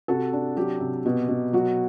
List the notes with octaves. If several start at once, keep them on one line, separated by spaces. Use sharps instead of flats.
C3 F#4 A4
D4
F#3 G4
C3
B2
B2
F#3 F#4